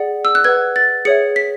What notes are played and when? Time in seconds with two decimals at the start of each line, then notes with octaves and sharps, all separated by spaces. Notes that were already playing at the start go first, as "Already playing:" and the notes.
Already playing: G#4 D5 F#5
0.25 E6
0.35 F#6
0.44 B4 F#5 G#6
0.76 A6
1.05 G#4 C#5 E5 C#7
1.36 B6